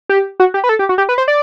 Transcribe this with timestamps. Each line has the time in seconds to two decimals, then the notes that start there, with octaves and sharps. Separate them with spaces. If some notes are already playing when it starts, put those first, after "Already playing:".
0.09 G4
0.40 F#4
0.54 G4
0.64 B4
0.69 A4
0.79 G4
0.89 F#4
0.98 G4
1.09 B4
1.18 C5
1.28 D5